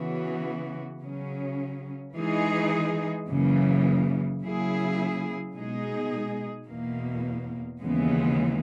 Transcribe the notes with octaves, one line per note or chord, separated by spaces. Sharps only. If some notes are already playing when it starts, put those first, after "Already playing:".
Already playing: C#3 E3 B3 F#4
C#3 F#3 C#4
E3 G#3 D#4 G#4
F#2 C#3 E3 A#3
C#3 F#3 A#3 E4 G#4
B2 G#3 D#4 G#4
E2 B2 A#3
D#2 C#3 E3 G#3 B3